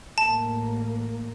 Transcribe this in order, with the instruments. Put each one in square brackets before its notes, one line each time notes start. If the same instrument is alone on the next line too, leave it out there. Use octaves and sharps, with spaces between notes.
[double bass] A1 A#3 [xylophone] A5